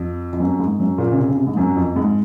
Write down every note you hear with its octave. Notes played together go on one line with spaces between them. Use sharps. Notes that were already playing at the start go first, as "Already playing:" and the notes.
Already playing: F2
F2
F#2
G#2
F#2
A#2
C#3
C3
C#3
C3
G#2
F#2
F2
G#2